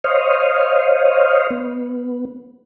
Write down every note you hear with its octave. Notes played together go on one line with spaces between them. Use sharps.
C5 C#5 D#5 F5
B3